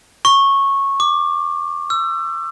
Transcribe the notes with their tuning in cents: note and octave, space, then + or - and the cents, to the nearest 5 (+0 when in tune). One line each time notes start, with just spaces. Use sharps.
C#6 -10
D6 +15
E6 +35